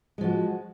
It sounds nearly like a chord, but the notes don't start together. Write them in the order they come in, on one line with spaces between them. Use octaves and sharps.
G#3 F3 F#4